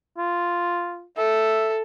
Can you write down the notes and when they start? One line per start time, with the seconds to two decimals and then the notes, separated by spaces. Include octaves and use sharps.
0.17 F4
1.17 A4 E5